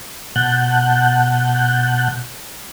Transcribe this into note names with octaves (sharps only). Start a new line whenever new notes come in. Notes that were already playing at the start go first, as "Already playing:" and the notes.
B2 F#5 A5 F#6 G6